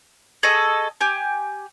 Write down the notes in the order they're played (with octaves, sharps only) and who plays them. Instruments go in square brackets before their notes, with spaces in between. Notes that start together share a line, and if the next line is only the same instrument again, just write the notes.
[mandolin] G#4 A4 D#5 C#6
G4 G#5